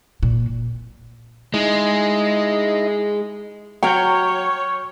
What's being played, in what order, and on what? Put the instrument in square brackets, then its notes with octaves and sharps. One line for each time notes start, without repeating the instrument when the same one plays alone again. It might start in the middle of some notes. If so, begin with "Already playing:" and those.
[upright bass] A#2
[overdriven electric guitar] G#3 [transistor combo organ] D#4 E4 D#5
[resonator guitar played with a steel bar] F#3 F#4 [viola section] C#5 [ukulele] G5 [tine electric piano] C#6 F6 G6